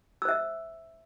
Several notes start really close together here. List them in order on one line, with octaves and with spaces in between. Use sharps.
E6 C5 E5